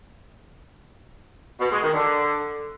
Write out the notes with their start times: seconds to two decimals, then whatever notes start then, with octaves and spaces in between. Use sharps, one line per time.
1.61 B2
1.71 G#3
1.82 D#3
1.93 D3